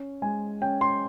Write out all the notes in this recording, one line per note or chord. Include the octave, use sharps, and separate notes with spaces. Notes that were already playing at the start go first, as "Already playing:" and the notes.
Already playing: C#4
G#3 G#5
C#4 G5
C6